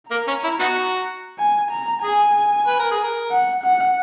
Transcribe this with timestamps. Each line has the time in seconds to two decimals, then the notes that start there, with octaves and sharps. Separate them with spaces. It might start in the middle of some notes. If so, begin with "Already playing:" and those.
0.11 A#3 A#5
0.28 C#4
0.44 E4
0.60 B3 D#4 F#4
1.39 G#5
1.71 A#5
2.03 G#4 G#5
2.67 B4
2.79 A#4
2.91 G#4
3.04 A#4
3.31 F#5
3.63 F#5